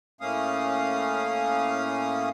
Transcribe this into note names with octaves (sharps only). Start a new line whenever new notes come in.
A2 A3 A#3 C#4 F5 D#6